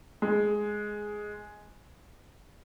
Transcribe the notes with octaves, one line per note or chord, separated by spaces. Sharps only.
G#3